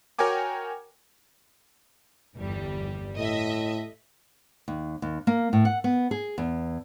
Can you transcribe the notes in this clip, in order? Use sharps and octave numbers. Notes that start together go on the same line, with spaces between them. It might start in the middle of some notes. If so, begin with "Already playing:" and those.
F#4 A#4 C#5 G5 G#5 D6
G1 E2 G3
A2 D#5 E5
D#2
D#2
A#3
A2
F#5
B3
G#4
E2